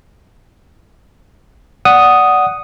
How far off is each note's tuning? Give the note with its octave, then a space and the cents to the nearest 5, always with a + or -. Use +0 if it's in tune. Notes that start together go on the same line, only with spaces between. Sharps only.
D5 -10 F#5 +0 D#6 +0